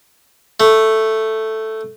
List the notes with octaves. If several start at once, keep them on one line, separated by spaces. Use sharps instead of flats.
A3